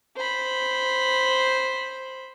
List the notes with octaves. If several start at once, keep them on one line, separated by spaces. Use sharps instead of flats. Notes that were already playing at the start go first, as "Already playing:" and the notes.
C5 B5